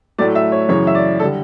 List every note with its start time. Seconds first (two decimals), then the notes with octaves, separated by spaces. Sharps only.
0.18 A2 F#3 A3 D5
0.35 E5
0.52 C#5
0.69 F#2 C#3 E3 C#5
0.87 E5
0.95 D5
1.20 A4
1.23 D3 G3